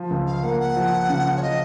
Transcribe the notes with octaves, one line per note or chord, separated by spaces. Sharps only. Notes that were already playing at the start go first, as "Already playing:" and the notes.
Already playing: F3
C#2
F5
A#3 F#5
F#5
F3
C#3
C#5
F3 D#5